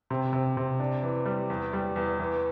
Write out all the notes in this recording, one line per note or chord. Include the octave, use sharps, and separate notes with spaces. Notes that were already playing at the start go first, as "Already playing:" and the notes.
C3
C3
C3
D4
E3
G3
E2
G3
E2
E3